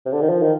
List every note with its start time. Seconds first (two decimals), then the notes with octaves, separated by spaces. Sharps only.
0.06 C3
0.13 D3
0.21 D#3
0.29 F3
0.42 D#3